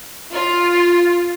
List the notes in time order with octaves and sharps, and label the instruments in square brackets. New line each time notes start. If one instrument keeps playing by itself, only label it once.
[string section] F4